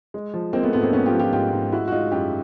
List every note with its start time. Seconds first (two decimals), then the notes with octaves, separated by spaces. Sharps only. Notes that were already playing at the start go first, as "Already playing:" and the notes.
0.14 G#3
0.34 F3
0.53 G#3 A#3 C4
0.63 A3 B3
0.73 G#2 A3 B3
0.83 A#3 C4
0.93 G#2 B3 C#4
1.06 F4 G4
1.12 F3
1.20 F4 G4
1.33 G#2 F4 G4
1.53 G#2
1.72 G#3 E4 F#4
1.88 F#4
1.92 G#3 D#4 F4
2.11 F#2 F4 G4